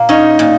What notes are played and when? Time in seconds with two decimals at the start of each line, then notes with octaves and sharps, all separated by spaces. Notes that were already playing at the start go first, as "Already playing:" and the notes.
Already playing: A#2 A#3
0.09 C#4 D#4
0.39 A#2